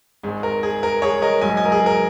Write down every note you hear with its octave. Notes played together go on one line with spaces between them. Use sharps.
G#1 G#2 G#3
A#4
G#4
A#4
G#4 C#5
A#4 D#5
A#1 G#2 F#3 D#5 G#5
D#5 G#5
A#4
G#4
A#4